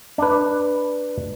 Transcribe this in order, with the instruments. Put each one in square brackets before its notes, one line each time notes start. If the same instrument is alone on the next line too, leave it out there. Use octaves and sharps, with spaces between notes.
[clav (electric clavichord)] D4 B4